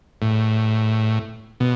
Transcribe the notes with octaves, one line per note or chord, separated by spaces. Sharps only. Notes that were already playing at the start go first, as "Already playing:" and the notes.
A2
B2